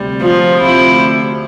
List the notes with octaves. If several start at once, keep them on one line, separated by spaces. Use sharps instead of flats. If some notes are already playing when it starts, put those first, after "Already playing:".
Already playing: D2 C3 G3
F3 F4
D2 C3 F3 E4